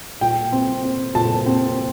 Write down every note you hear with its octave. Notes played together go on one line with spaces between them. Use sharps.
A#2 G5
C4
C4
A#2 A5
C4